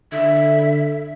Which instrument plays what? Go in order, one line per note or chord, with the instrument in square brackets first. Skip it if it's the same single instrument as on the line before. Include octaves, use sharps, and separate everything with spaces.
[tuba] D3 [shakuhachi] E5